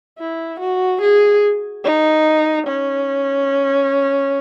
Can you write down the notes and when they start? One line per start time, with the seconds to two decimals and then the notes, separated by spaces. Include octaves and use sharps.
0.18 E4
0.59 F#4
1.01 G#4
1.84 D#4
2.67 C#4